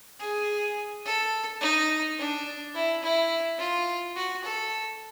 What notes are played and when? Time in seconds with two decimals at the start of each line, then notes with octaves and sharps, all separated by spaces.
0.20 G#4
1.05 A4
1.61 D#4
2.19 D4
2.75 E4
3.03 E4
3.59 F4
4.16 F#4
4.44 A4